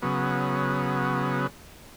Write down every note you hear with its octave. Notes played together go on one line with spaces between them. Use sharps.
C#3 F#3 B3